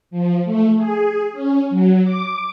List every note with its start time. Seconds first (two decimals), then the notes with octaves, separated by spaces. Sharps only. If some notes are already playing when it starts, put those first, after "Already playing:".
0.11 F3
0.45 A3
0.77 G#4
1.33 C#4
1.70 F#3
2.04 D6